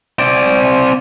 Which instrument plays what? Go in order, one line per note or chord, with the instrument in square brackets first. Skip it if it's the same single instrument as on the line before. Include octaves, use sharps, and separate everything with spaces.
[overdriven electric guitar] C4 D5